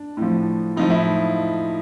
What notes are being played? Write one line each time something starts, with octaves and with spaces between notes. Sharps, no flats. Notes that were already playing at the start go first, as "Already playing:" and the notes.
Already playing: D4
A2 F3
A2 F3 D#4
E4